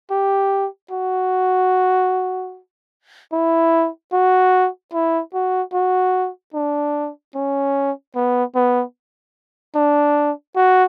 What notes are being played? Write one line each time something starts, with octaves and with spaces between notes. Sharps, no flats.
G4
F#4
E4
F#4
E4
F#4
F#4
D4
C#4
B3
B3
D4
F#4